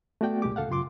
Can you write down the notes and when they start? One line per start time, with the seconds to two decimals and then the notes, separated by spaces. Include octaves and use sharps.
0.21 A3 B3 F#4 D5 G5
0.42 C2 A#2 G#3 G4 D6
0.56 C#2 A4 F5 F#5
0.69 F#2 C#3 F4 C6 D6